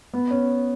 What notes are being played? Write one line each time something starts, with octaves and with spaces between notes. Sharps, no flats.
B3
C#4